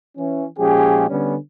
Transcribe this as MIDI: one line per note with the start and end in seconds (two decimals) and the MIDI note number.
0.17 0.45 52
0.17 0.45 61
0.58 1.05 46
0.58 1.05 53
0.58 1.05 56
0.58 1.05 61
0.58 1.05 67
0.58 1.05 68
1.09 1.34 50
1.09 1.34 55
1.09 1.34 59
1.09 1.34 61